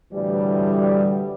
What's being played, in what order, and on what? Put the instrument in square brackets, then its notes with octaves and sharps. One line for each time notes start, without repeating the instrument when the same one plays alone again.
[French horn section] D2 A2 E3 G3